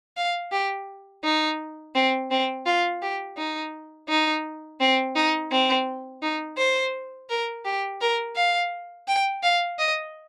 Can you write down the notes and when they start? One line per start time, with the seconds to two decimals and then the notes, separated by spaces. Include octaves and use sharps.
0.17 F5
0.52 G4
1.24 D#4
1.95 C4
2.31 C4
2.66 F4
3.02 G4
3.37 D#4
4.09 D#4
4.80 C4
5.16 D#4
5.51 C4
6.22 D#4
6.58 C5
7.29 A#4
7.65 G4
8.01 A#4
8.36 F5
9.08 G5
9.43 F5
9.79 D#5